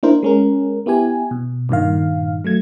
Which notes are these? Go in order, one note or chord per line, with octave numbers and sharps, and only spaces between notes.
A#3 D4 E4 A#4 C5
G#3 C#4 A#4
B3 E4 G4 G#5
B2
G2 A#2 D#3 F5
F#3 A3 G#6